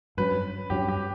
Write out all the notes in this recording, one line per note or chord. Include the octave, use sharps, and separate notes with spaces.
G2 F#3 C#4 B4
G2 F#3 C#4 G4
G4